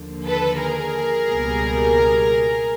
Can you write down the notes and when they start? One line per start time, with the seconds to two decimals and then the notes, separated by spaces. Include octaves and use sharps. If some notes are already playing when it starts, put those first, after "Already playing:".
Already playing: D#2 D3 F3 A#3
0.26 A4 B4
0.60 G#4 A#4
1.29 C#2 B2 G3 A#3